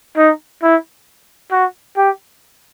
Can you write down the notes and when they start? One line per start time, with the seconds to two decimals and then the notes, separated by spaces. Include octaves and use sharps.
0.17 D#4
0.62 E4
1.51 F#4
1.97 G4